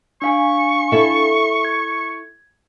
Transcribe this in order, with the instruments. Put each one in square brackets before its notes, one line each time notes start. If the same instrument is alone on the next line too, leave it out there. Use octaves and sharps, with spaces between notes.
[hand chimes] D4 F5 G#5 [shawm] C#6
[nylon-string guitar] E4 A4 E5
[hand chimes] G#6